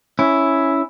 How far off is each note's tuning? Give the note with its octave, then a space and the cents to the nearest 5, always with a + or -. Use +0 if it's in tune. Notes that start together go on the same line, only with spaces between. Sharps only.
C#4 +0 E4 +0